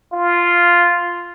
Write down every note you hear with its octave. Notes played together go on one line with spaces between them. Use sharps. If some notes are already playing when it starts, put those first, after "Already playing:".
F4